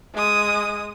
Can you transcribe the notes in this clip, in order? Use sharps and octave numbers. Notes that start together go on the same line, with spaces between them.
G#3 D#6